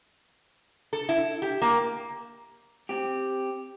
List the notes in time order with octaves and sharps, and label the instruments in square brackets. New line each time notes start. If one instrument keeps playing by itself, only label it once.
[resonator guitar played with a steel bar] A4
E4
G4
A#3
[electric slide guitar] C4 G4